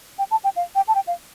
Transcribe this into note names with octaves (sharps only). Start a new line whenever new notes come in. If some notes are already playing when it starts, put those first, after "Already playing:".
G5
A5
G5
F5
G5
A5
G5
F5